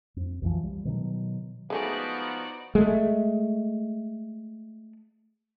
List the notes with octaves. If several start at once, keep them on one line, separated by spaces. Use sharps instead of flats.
F2
B1 F2 E3 F3
G3
B2 D#3 E3 F#3
F3 G#3 A3 B3 D#4 F#4 G#4 D5
G#3 A3